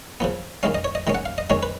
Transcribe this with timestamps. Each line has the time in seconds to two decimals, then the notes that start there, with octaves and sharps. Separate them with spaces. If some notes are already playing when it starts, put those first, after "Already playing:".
0.20 C#3 F3 B3
0.63 D#3 G#3 C#4 F5
0.75 D#5
0.84 C#5
0.95 D#5
1.07 D#3 G#3 C#4
1.15 F#5
1.26 F5
1.38 D#5
1.50 D#3 G#3 C#4 C#5
1.63 B4